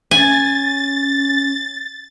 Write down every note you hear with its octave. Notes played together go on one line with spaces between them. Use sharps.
C#4 G#5 A6